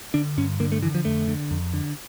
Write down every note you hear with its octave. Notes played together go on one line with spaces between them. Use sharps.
D3 D4
G2 C#4
D3 A#3
A3
D3 E3
F3
F2 A3
D3
F2
D3